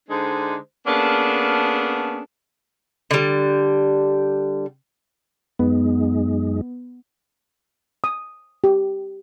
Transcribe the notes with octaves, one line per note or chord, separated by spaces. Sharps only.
D3 G#3 D4 D#4 C5
A#3 B3 C#4 D4 G#4 A4
D3 G3
F#2 G#3 B3 D#4
D#6
G4